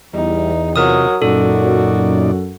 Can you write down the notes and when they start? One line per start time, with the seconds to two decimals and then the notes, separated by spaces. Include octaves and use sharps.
0.14 E2 G3 D#4
0.76 C3 F#3 F4 A#4 D#5 D#6
1.22 F#2 A#2 D#4 F#4 A4 D5